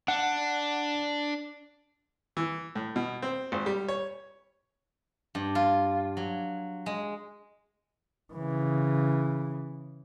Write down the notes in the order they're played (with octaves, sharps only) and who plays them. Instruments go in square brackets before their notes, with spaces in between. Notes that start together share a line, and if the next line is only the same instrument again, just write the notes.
[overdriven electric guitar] D4 [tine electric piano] F#5
[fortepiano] E3
A2
B2
C4
G#1
G3
C#5
[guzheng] G2
F4
F#3
G#3
[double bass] C#3 E3